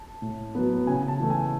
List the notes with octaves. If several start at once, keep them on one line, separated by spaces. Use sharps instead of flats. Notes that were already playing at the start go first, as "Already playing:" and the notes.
Already playing: A5
A2
F#3 B3
C#3 G#5
A5
E3 A3
G#5